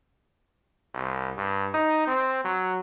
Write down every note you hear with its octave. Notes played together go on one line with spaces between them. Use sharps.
C2
G2
D#4
C4
F#3